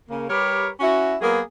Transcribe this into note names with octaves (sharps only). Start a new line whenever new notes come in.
C#3 A#3
G3 G4 A#4 B4 C#5
C#4 E4 F#4
F#3 A#3 B3 G#4